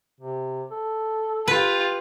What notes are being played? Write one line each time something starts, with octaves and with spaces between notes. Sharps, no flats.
C3
A4
F4 G4 B4